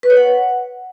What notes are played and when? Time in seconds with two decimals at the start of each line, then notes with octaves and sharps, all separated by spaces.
0.03 B4
0.10 C#5
0.17 F#5